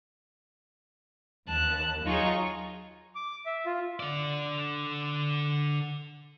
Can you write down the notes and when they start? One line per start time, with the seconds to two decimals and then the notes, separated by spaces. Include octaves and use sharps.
1.48 D#2 A5 F#6
2.06 F#3 D#4 F4 G#4 C#6
3.15 D6
3.46 E5
3.66 F4
4.00 D3 D5